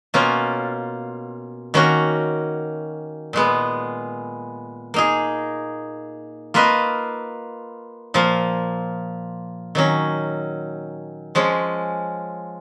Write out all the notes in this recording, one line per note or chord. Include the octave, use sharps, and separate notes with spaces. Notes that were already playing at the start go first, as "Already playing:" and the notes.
B2 A#3 C#4 F4
D#3 A#3 C#4 F#4
A#2 G#3 B3
A#3 D#4 G#4
A#3 F4 B4 D#5
A#2 F3 A#3
D#3 F#3 C#4
F3 G#3 C#4